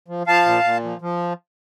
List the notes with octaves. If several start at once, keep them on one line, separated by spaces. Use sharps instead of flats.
F3
F3 F5 A5
A#2
A#2
F3
F3